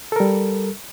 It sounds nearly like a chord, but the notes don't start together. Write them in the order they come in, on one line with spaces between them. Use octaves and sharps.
A4 A#4 G3